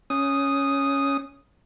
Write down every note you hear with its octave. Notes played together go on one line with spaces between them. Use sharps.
C#4 D#6